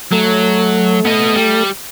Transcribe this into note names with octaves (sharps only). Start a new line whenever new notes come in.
F#3 A3
B3 D#5
G3